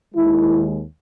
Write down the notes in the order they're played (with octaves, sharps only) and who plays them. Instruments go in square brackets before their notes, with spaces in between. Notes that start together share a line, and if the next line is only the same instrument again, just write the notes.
[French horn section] D#2 D#3 G#3 E4